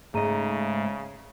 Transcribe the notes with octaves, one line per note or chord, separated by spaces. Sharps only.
G#2 C#3 A3 G#4 D#5 A#5 D#7